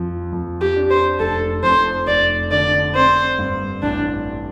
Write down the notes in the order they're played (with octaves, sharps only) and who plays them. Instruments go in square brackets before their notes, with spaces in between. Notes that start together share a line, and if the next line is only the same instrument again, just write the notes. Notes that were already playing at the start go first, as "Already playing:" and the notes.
Already playing: [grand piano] F2 F3
F2
[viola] G4
[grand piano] D4
[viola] C5
[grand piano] F1 [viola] A4
[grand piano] F2 [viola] C5
[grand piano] F1 [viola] D5
[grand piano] D3 [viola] D5
[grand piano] C4 [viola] C5
[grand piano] G2
[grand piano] A1 [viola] D4